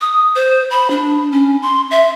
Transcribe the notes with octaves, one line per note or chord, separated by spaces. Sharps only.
D#6
C5
B5
D4
C#4
C6
E5